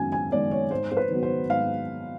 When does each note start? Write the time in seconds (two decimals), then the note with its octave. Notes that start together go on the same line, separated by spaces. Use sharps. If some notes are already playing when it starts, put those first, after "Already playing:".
Already playing: F#2 D#3 G#3 B3 G#5
0.12 G#5
0.32 D#3 G#3 B3 D5
0.51 C#5
0.71 G#2 C5
0.92 C5
0.97 B4
1.10 D#3 F#3 B3
1.23 C5
1.49 G#2 F5